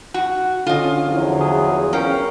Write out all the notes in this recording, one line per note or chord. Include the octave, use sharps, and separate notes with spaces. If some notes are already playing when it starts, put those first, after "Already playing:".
F#4
D3 C#4 F4 D#5
E2 F3 F#3
G#4
C#4 A#4 F5 G5